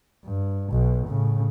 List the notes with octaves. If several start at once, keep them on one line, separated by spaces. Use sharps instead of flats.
G2
B1 B2
A2 C#3